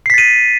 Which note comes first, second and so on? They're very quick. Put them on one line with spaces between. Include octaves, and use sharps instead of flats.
C7 B6 A6 D#7